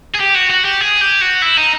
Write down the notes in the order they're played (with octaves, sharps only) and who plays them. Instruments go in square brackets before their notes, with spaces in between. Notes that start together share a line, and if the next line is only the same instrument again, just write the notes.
[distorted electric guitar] G#4
G4
F#4
F#4
G4
G#4
G4
F#4
E4
D#4